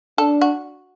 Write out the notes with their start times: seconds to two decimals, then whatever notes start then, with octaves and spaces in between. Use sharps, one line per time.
0.18 D4 A4
0.41 F#4